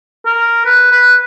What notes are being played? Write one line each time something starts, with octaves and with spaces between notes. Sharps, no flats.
A#4
B4
B4